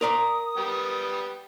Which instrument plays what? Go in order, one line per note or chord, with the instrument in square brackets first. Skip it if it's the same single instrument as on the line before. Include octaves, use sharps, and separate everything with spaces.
[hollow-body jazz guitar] A#4 D5 A#5 [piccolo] D#6
[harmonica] G3 B3 G4